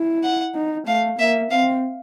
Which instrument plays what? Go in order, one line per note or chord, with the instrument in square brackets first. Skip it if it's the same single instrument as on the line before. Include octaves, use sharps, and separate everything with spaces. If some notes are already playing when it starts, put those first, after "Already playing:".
Already playing: [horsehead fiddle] E4
[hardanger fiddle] F#5
[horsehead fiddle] D#4
[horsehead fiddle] A3 [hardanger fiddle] F5
[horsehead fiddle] A#3 [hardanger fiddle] E5
[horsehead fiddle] C4 [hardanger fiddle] F5